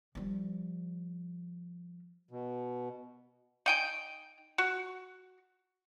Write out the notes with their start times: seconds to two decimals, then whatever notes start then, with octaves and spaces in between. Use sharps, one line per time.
0.15 F3 G3
2.31 B2
3.66 D#4 G5 G#5
4.58 F#4